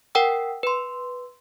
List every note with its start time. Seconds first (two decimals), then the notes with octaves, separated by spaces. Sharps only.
0.15 A#4 F#5 G5 E6
0.63 B4 C6